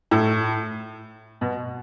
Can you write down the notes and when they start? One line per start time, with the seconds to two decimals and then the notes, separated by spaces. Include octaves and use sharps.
0.11 A2
1.41 B2